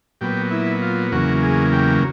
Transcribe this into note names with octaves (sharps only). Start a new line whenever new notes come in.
A#2 F#3 B3 G4
E4
F4
E2 C#3 F#3 A#3 F#4
G#4
G4